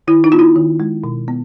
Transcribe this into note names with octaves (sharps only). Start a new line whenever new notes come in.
D#3 E4
D#4
B3 F4
E4
D#3
G#3
B2
B3